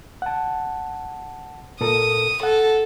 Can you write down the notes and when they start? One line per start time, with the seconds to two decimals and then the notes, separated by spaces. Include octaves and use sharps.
0.22 F#5 A5
1.81 A#2 A4 A#4 D#6
2.43 A4 F#5